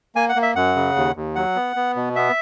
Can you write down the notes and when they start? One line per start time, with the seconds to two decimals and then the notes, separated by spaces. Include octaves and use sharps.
0.15 A#3 G#5
0.29 F#5
0.36 A#3
0.42 E5
0.56 F#2 F#5
0.76 C#3
0.96 D#2
1.16 D#2
1.36 F#3 F#5
1.56 B3
1.76 B3
1.96 B2
2.16 B3 E5